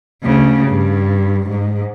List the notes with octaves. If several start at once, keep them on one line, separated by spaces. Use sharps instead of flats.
D2 C#3
G2
G#2